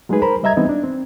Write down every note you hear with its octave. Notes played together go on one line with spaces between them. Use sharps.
F#3 G#3 A3 D#4 G#4 B4
A#4 C5 A#5 B5
G3 D#5 E5 A#5 G#6
E3 G3 B3 C4 D#4 D#5
D4
C4